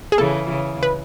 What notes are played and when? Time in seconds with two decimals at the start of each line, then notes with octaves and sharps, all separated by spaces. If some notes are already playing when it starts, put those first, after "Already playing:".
0.12 G#4
0.18 C#3 E3 A4
0.50 C#3
0.83 B4